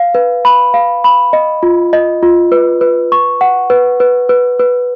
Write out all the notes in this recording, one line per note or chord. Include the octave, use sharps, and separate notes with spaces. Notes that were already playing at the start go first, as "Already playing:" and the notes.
Already playing: F5
B4
B5
F5
B5
D#5
F4
D#5
F4
B4
B4
C#6
F#5
B4
B4
B4
B4